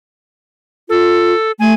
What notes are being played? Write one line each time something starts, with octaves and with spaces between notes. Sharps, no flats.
F4 A4
A3 G#5